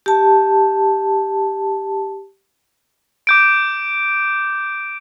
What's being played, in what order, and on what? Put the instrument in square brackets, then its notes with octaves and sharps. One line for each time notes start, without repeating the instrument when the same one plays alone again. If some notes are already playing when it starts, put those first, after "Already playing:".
[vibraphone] G4 A5
[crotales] D6 G6 D7